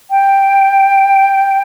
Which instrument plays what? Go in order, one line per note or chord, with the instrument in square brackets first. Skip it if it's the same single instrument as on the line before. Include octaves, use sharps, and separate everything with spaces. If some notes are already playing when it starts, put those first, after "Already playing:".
[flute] G5